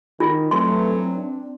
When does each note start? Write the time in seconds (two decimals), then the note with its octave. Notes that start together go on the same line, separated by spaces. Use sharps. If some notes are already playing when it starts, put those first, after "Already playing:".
0.20 D#3 F4
0.51 G2 E3 F#3 A3 C4 C6
1.16 D4